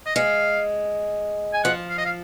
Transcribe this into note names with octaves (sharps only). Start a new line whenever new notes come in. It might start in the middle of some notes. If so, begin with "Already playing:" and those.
D#5
G#3 F5
G#5
F3 F#5
F5
D#5
F5